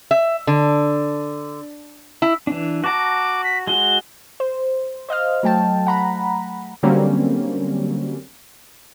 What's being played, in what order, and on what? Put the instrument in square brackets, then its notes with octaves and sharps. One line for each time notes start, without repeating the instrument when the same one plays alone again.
[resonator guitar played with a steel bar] E5
D3
E4
[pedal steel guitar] E3 D4
[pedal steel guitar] F#4 A5 A#5 [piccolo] D6
[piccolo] B6
[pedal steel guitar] G#3 F#4 [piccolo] G7
[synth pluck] C5
C5 D#5 F5 F6
F#3 A3 G5 A5
F#5 A#5 B5
[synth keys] D3 F#3 G3 A#3 C4 C#4